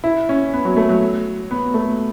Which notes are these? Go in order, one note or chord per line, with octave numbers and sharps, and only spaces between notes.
E4
C#4
B3
F#3
A3
F#3
B3
A3